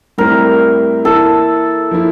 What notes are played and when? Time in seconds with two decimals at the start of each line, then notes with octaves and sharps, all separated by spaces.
0.18 A2 G3 C4 E4 A#4
1.04 E3 A#3 E4 A4
1.91 F3 A#3 E4